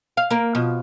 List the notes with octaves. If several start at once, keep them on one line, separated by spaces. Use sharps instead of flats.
F5
A#3 A#4
B2 F3